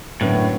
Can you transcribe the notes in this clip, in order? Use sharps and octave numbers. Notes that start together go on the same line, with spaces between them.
F#2 A2 D3 B3 D4